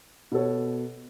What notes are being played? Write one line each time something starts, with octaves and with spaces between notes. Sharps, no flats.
B2 B3 A4 C#5